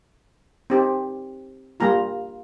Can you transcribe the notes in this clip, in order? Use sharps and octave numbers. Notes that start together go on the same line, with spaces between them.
C4 D#4 G4
G3 A#3 F4 A#5